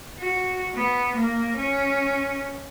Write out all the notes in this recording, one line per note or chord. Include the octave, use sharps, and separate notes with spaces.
F#4
B3
A#3
C#4